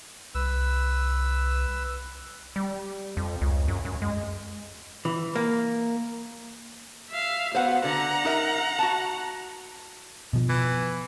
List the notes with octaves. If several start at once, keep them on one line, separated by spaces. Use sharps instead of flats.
C2 B4 E6
G3
F2
C#2
F#2
F#2
G#3
E3
A#3
E5 F5
B3 F#4 C5 F5 F#5
D3 F#5 A#5
D#4 A#4 E5
F#4 A5
B2 F3
E3